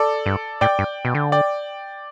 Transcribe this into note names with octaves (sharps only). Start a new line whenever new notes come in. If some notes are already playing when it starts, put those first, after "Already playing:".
Already playing: A4 D5
G2
A2 D5 G5
G2
B2
D3
D5 G5